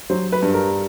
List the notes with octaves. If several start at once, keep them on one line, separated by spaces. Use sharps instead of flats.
F#3 C5
B4
G2
A#4